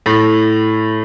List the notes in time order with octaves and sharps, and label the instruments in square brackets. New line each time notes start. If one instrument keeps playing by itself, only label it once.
[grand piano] A2